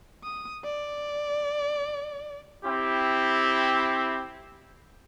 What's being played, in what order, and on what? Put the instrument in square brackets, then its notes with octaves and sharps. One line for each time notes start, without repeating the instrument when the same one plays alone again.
[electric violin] D#6
D5
[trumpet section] C4 E4 G4